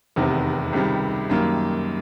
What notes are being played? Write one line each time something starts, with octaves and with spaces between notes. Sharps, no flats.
F1 E2 C3 D#3
C#2 C3 D#3 G3
F#2 D#3 G3 A#3